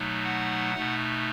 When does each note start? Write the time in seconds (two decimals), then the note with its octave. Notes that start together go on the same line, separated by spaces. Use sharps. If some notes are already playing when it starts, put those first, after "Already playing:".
Already playing: B2 F#3 A3 D#4
0.24 F#5
0.74 B2 A3 D#4